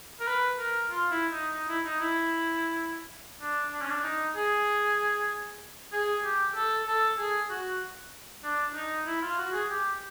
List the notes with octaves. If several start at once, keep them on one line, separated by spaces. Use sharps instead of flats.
A#4
B4
A#4
F4
E4
D#4
D#4
E4
D#4
E4
D4
D4
C#4
D4
D#4
G#4
G#4
G4
A4
A4
G#4
F#4
D4
D#4
E4
F4
F#4
G#4
G4